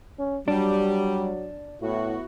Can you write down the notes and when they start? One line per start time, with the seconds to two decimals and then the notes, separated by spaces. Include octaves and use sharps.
0.19 C#4
0.48 F#3 G3 D4
1.82 A2 B3 E4 F#4